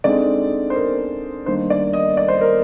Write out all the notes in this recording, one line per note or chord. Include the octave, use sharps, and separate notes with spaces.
D3 G#3 C4 D#4 D5
C5
A#4
D#3 G3 A#3 D4 C5
D5
D#5
D5
C5
A#4